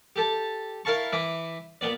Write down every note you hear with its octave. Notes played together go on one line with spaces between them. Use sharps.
G4 A4 A5
E4 A#4 F5 A5 C#6
E3 E4 E5 D6
A#2 B3 D5